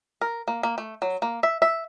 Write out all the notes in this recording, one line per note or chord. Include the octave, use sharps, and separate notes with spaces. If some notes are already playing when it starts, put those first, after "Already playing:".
A#4
A#3
A#3
A3
F#3
A#3
E5
E5